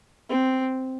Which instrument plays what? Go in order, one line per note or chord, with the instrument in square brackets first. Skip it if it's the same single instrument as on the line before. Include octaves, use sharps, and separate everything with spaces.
[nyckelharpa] C4